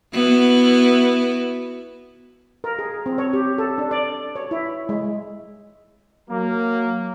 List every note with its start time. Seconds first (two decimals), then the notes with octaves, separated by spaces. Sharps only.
0.13 B3 E4 F#4
2.64 A#4
2.79 G#4
3.06 C4
3.18 C#5
3.33 G4
3.58 A4
3.78 D4
3.91 D5
4.36 C#5
4.51 E4
4.89 G#3
6.30 F#3 A#3